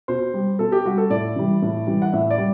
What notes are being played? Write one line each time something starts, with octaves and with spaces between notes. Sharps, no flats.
B2 C5
G3
B2 A4
G4
G3 F#4
A4
A2 D5
E3 G3
A2
E3 G3
F#5
A2 E5
D5
G3